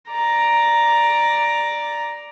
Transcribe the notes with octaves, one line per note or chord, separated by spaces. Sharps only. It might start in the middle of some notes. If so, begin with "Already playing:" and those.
D5 A#5